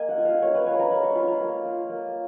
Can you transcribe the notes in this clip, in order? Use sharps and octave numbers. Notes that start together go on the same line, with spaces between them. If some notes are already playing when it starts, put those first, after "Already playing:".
Already playing: A#3 D#5 G#5
F#5
F4
F5
A#3 C#5
B4
F4 C#5
B5
A#5
A#3 B5
C#6
F4 B5
A#5
A#3
F4
A#3